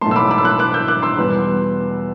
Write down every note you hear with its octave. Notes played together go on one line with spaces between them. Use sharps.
B1 A2 E3 A3 A5 C6
E6
B5 D6
B5 D6
E6
D6 F#6
D6 F#6
E6 G6
D6 F#6
C6 E6
E2 B2 G3 B3